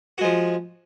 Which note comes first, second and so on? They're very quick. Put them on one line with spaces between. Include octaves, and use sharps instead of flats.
F#4 G#3 F3